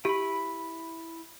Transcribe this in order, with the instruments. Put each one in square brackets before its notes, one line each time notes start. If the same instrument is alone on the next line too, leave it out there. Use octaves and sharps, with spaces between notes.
[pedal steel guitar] E4 B5 [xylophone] G4